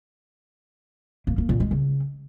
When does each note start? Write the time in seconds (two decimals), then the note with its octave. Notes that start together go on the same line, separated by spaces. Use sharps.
1.27 A#3
1.38 A#3
1.49 A#2
1.60 G#3
1.71 C#3